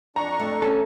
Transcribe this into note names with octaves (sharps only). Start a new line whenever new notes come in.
F2 D4 A#5 C#6
A3
C#4 A4